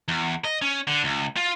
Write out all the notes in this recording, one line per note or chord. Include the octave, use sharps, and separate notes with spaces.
E2
D#5
C#4
D3
C#2
F4